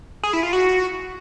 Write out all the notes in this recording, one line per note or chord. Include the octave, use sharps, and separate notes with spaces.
G#4
E4
F4
F#4